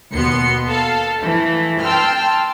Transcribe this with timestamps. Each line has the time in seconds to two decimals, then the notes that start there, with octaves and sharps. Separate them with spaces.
0.12 D#2 B2 B3 C6 C#7
0.69 A4 F5 A5
1.20 E3 A3
1.84 G5 A5 C6 E6 F6